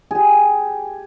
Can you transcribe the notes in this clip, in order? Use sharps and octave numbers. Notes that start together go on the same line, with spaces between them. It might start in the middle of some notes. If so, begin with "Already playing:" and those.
G4 G#4